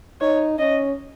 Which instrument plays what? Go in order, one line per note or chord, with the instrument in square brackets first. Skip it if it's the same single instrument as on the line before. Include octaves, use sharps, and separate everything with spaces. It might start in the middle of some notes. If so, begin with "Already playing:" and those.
[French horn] D#4 [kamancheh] C#5
[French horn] C#4 [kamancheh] D#5